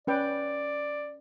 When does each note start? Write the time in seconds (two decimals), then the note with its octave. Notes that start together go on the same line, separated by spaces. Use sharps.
0.07 C#4 B4 D5 G5